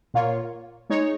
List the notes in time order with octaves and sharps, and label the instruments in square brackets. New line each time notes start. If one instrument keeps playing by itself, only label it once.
[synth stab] A#2 A#3 F4 C#5
G#3 D#4 C#5